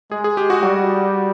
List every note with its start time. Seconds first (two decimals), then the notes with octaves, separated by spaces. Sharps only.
0.11 G#3 G#4
0.24 G#4
0.37 G4
0.50 F#4
0.62 G3 F#4